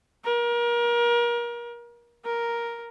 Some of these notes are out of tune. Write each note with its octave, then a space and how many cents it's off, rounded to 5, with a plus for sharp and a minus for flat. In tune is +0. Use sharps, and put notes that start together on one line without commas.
A#4 +30
A#4 +5